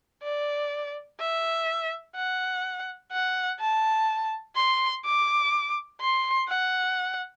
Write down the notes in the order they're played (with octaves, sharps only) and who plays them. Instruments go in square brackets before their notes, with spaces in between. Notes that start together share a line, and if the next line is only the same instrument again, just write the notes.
[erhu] D5
E5
F#5
F#5
A5
C6
D6
C6
F#5